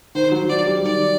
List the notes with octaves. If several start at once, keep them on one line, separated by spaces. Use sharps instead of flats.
D#3 C5
F#3
F#3 D5
G3
D#3 D5